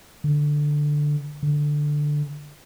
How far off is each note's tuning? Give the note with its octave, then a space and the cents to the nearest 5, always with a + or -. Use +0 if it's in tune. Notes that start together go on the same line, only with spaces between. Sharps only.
D3 +5
D3 +5